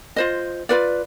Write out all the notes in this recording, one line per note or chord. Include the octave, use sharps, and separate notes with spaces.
F4 C5 D#5
F4 B4 D5